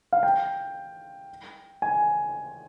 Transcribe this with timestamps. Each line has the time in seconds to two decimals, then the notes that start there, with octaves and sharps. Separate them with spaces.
0.13 F5
0.23 G5
1.82 G#5